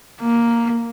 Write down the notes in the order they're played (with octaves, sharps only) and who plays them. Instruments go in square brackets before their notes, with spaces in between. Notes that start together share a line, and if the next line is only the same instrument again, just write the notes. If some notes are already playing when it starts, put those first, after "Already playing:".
[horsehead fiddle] A#3